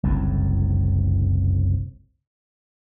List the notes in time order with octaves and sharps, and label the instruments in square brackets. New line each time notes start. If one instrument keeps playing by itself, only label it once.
[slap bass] F#1 C2 F2 A2